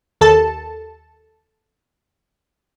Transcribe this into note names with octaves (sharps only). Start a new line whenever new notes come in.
D#2 A4 A5